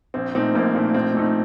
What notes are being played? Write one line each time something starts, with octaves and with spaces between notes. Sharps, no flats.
A#1 C4
A#2 A3 C4 D#4
A#1 A#3
A#2 A3 D#4
A#1 C4
A#2 A3 D#4